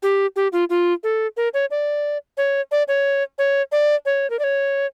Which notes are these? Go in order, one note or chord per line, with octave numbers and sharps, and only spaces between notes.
G4
G4
F4
F4
A4
A#4
C#5
D5
C#5
D5
C#5
C#5
D5
C#5
A#4
D5
C#5